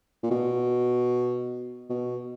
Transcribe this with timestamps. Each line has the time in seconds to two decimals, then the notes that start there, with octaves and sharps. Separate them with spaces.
0.23 A#2
0.30 B2
1.90 B2